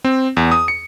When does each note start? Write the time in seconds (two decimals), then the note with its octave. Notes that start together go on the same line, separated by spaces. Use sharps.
0.04 C4
0.37 E2
0.52 D#6
0.68 C#7